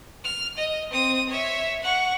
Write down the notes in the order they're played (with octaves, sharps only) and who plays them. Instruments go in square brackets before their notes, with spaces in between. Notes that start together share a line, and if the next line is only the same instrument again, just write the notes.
[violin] F6
D#5
C4 D#6
C#5 E5
F#5 C#6